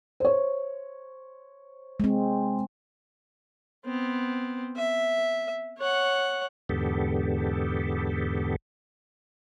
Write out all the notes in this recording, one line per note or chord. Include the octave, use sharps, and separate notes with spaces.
C5 C#5
G#3 C4
B3 C4
E5
C#5 F#5
E2 G#2 D3 B3 G4 A4